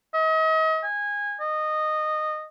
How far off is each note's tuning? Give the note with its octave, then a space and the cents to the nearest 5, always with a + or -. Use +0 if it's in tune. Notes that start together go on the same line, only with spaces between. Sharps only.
D#5 +40
G#5 -20
D#5 -15